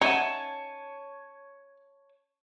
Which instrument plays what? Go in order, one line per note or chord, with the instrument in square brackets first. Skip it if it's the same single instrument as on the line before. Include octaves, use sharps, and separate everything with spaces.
[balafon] C#4 E5 F#5 [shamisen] D#4 [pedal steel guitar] C#5 G#5 A5